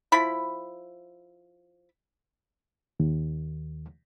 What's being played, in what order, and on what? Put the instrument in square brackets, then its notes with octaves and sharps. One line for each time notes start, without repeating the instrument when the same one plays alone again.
[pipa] F3 E4 B5
[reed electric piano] D#2